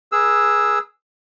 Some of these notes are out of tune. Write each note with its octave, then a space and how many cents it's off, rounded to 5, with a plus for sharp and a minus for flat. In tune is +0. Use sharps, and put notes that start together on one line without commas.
G#4 +0 B4 -40 E6 +0